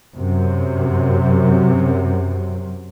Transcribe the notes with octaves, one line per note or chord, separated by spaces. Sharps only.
F#2 C3